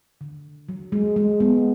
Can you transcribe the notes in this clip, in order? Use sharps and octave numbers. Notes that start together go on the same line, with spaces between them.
D3
F#3
G#3
G#3
G#3 B3